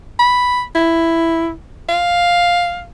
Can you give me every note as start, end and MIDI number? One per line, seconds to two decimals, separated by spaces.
0.19 0.63 83
0.75 1.51 64
1.89 2.85 77